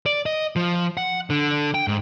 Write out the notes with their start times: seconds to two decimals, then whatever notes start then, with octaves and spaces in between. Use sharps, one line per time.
0.06 D5
0.26 D#5
0.56 F3
0.97 F#5
1.30 D3
1.74 G5
1.88 G#2